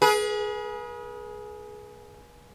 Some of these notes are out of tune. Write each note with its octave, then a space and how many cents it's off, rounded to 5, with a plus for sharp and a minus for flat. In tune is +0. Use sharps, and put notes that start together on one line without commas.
G#4 +15 B4 -40